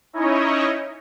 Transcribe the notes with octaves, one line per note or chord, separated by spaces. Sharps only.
C#4 D#4 E4 C#5 D#5